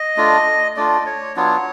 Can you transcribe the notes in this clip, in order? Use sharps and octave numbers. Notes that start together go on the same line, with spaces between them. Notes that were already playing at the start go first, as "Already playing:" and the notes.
Already playing: D#5
A3 D4 F4
A3 D4 F4 D5
C#5
F#3 B3 D4 F4 C#5